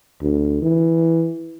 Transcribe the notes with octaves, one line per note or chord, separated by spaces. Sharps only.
D2
E3